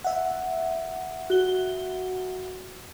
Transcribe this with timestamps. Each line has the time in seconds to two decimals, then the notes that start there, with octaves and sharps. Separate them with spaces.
0.04 E5 F#5
1.30 F#4 G7